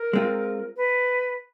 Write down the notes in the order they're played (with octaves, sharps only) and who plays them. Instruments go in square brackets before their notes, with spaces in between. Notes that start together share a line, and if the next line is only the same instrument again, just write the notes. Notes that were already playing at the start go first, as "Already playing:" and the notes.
Already playing: [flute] A#4
[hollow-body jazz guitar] G#3 C4 F4
[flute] B4